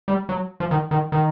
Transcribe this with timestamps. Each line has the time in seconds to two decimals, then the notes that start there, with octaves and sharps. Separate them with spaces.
0.08 G3
0.29 F#3
0.60 F3
0.71 D#3
0.91 D#3
1.12 D#3